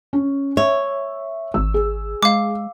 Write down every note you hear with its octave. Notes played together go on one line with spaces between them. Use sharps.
C#4
C#5 E5
G#1 E6
G#4
G#3 F5 D6